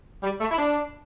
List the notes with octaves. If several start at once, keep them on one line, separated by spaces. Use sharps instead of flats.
G3
A3
E4
D4